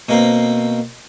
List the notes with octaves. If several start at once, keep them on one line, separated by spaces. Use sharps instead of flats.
B2 A#3 C4